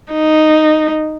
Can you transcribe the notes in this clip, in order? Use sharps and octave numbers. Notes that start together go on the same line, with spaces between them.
D#4